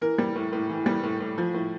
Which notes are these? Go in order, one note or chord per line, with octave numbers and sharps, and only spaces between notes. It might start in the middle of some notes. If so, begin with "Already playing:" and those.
E3 A#4
G3
A2
A2
E3
G3
A2
A2
F3
A2